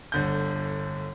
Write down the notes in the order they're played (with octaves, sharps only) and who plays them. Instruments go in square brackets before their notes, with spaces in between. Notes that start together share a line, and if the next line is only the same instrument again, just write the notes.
[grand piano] G1 D3 G6